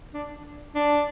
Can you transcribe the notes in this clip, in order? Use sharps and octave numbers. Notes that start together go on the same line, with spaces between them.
D4
D4